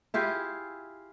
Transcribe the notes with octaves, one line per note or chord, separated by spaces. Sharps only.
E4 F4 G4 G#4